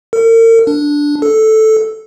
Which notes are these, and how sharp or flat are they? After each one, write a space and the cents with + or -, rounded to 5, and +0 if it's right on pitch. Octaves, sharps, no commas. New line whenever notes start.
A#4 -40
D4 -5
A4 -5